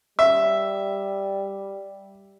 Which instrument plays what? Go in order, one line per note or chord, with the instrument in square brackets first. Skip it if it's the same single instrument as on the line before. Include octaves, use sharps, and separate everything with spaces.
[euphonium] G3 [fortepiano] E5